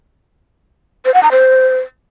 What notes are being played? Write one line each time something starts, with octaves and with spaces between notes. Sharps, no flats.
C5
F#5
A#5
C5